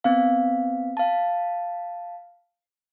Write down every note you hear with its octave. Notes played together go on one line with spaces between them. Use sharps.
B3 C4 F5
F5 A5